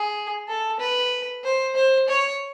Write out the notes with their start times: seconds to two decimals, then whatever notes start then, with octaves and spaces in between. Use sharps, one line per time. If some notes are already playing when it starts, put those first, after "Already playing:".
Already playing: G#4
0.48 A4
0.80 B4
1.44 C5
1.76 C5
2.08 C#5